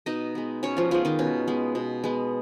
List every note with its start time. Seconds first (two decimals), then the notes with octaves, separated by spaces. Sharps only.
0.06 B2 D#4 D#5
0.35 G#3 B3
0.63 B2 C#4 C#5
0.77 F3 F4
0.91 F3 G#3 B3 F4
1.05 D#3 D#4
1.19 B2 C#4
1.48 G#3 B3
1.75 B2
2.04 G#3 B3